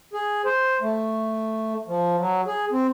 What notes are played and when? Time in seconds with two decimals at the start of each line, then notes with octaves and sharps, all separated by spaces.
0.13 G#4
0.46 C5
0.81 A3
1.88 F3
2.19 F#3
2.47 G#4
2.71 C4